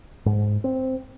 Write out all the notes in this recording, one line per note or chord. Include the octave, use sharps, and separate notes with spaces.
G#2
C4